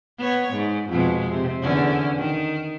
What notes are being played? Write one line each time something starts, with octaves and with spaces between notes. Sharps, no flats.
B3 C#5
G#2
F2 B2 G#3
C3
E2 D3 C#4
D#3